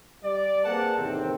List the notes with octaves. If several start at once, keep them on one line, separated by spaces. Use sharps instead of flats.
G3 D5
A#3 C4 G#4 B4 F#5 A5
E2 A2 C3 D#3 C4